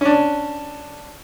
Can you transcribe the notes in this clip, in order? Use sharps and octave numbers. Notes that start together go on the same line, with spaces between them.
C#4 D4